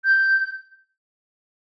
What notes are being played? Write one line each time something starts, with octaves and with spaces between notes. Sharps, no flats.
G6